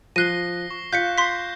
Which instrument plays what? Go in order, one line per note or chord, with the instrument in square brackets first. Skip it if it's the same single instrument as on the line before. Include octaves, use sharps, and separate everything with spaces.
[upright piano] F3 [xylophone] F#6 D#7 [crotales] A#6 C7 G7
[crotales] C#6
[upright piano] F4 [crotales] F#6 [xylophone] G6 B6 C#7
[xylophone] C6 B6 [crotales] G6 C7